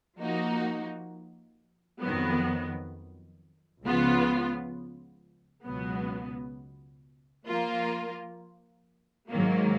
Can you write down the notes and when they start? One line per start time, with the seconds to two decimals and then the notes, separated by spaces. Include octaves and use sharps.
0.20 F3 A#3 D#4 F#4
2.01 F2 D#3 F#3 B3
3.84 C#2 C#3 F3 B3 F4
5.66 C#2 B2 F#3 B3
7.48 F3 A#3 F4 A#4
9.30 G#2 D#3 F#3 A#3